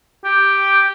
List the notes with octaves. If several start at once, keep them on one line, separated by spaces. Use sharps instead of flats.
G4